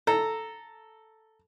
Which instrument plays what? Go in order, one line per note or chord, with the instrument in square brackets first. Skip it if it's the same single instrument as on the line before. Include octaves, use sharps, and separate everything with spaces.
[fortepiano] A4 [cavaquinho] A#5